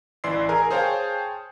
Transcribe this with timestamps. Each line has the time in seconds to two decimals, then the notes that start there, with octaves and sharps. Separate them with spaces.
0.24 A1 E3 D5 C6 E6 C7
0.49 G#4 A#4 G#5 A#5
0.70 G#4 C5 C#5 F5 G5 A5